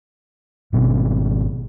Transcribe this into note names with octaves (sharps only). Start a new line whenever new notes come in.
G#1 B2 C4